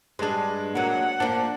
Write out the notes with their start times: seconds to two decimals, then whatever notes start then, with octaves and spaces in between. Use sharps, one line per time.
0.19 G2 G#3 D4 G#4
0.75 F#3 A#3 F#5
1.20 F3 A#3 D4